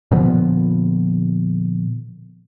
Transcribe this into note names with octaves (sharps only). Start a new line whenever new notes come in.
A#2 D3 F3 B3